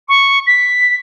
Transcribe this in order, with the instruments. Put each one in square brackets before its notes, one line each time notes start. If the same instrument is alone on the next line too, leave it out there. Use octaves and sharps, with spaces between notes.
[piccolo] C#6
B6